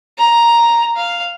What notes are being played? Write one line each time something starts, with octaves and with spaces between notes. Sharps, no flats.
A#5
F5